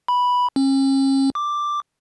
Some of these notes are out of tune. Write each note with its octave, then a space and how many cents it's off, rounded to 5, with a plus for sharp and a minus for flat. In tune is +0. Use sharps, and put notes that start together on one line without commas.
B5 -5
C#4 -40
D6 +5